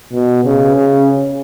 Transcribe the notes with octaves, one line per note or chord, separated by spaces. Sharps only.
B2
C#3
C#3